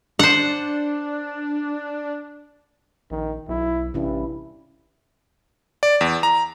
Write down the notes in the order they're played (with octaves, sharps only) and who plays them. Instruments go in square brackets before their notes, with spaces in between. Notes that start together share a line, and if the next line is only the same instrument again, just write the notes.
[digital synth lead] D4 [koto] C5 F#5
[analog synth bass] A#1 [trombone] D#3
[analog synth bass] B1 [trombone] E4
[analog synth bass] A1 [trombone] G2 [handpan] C3 C#4 E4
[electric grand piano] D5
E2
A#5